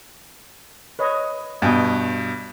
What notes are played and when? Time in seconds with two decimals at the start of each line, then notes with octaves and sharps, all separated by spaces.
0.99 B4 C#5 D#5
1.62 G2 B2 D#5 G5 G#5